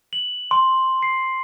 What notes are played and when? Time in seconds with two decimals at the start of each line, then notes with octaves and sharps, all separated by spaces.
0.13 F#7
0.51 C6
1.03 C7